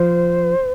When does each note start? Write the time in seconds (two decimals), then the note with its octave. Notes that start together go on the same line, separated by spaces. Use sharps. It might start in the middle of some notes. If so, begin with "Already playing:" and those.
Already playing: F3 C5